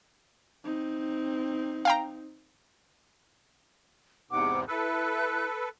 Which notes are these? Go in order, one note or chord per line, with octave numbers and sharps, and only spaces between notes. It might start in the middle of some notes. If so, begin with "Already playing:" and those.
C4 D#4
F5 G5 A#5
E2 G#2 C3 F#5 D6
E4 A4 B4 F#6